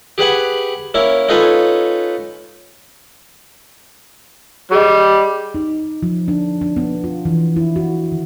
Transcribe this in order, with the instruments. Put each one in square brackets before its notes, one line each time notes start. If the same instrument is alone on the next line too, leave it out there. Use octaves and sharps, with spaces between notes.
[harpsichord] G4 G#4 B4 F#5 G#5
A#3 C#4 E4
C#4 D#4 F4 A4 B4 G#5
[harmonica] G3 [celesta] G#4 D#5
[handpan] D#4
F3
D4
D4
B3
F4
E3
E4
F#4
D#3